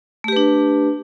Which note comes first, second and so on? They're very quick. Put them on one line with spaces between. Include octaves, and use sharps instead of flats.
A3 G4 B4 D4